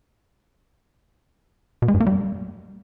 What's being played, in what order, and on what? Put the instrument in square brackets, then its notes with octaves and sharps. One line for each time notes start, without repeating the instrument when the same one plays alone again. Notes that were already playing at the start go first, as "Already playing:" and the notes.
[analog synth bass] B2
G#3
G2
A#3
G3